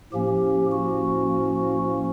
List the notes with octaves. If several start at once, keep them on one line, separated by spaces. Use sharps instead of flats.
A2 F3 A#3 C#4 G4
F#4